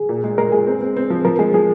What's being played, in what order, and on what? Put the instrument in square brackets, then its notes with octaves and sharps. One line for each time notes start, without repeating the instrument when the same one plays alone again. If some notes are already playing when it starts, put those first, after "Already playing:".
Already playing: [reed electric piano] G#4
[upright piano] A#2
G#3
[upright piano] G#3 [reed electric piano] A#4
[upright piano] G#3 [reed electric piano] G#4
[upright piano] C4
C4
C4
F3
[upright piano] F3 [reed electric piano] A#4
[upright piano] G#3 [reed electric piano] G#4
[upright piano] F3 [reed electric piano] G#4